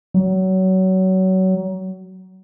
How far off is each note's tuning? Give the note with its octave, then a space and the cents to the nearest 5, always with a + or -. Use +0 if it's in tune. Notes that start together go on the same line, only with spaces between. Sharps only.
F#3 +25